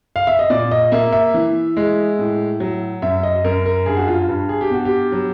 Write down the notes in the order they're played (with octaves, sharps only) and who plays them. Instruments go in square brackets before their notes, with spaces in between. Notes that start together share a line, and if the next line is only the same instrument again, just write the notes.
[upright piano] F5
E5
D#5
A#2 D5
D#5
A#3 E5
E5
E3
G#3
A2
F#3
F#2 E5
D#5
F#2 A#4
A#4
G2 G#4
F#4
F4
G2
G#4
G4
B2 F#4
G4
F#3